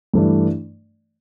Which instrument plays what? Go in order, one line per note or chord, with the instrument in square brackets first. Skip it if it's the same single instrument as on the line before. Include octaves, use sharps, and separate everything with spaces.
[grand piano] G2 E3 A3 D4